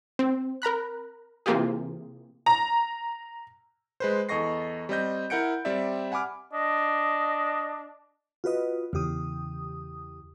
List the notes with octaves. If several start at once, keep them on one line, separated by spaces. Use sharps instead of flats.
C4
A#4 A#5 B5 F#6
C3 E3 A#3 F4 G4 G#4
A#5
G#3 B4 C5
E2 A4 D#5 C#6 A#6 C7
G3 C4 D#5 G6
E4 A#4 F#5 G6 C#7 D7
G3 C4 G4 D5 E5
F#5 G#5 B5 D6 F6
D4 D#5
F4 F#4 B4 D#5
E2 C#3 G4 D#6